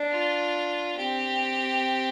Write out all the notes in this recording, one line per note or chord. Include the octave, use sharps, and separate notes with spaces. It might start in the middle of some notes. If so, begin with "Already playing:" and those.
Already playing: D4
F4
C4 G4